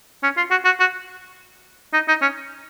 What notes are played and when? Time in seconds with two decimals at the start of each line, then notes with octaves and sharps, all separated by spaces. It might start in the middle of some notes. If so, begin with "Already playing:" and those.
0.23 C#4
0.37 F4
0.51 F#4
0.65 F#4
0.80 F#4
1.93 D#4
2.08 D#4
2.22 C#4